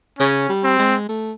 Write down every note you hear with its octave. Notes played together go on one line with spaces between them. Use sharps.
C#3 C#4
G3
C4
G#3
A3